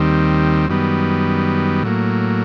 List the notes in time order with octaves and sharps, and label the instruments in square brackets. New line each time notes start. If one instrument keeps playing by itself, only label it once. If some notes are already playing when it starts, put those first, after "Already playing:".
Already playing: [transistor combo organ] D#2 D#3 G3 C4
F#2 D#3 G3 B3
A2 F#3 A#3